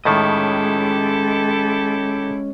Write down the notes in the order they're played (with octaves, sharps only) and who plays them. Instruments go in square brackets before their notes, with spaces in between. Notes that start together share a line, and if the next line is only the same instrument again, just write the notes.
[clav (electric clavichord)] A2 D#3 [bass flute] G#3 [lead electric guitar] C#4 D#5 [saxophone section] E4 G4 A4